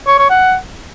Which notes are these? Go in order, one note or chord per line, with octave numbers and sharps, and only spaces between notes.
C#5
C#5
F#5